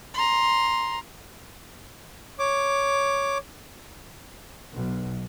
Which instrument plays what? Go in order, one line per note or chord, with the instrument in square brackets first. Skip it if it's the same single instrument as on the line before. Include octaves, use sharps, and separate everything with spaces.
[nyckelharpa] A#5 C6
[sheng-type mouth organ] C#5 D6
[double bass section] B1